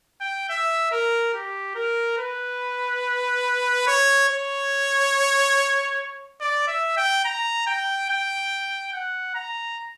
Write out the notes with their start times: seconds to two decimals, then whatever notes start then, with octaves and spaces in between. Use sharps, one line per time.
0.21 G5
0.49 E5
0.92 A#4
1.34 G4
1.75 A#4
2.18 B4
3.87 C#5
4.29 C#5
6.40 D5
6.67 E5
6.97 G5
7.25 A#5
7.67 G5
8.09 G5
8.93 F#5
9.35 A#5